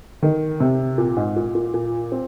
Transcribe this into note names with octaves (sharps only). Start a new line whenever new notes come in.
D#3
C3
A#2
G#2
A#2
A#2
A#2
C4